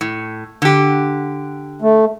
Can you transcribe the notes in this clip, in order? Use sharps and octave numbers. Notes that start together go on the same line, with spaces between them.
A2
D3 G4
A3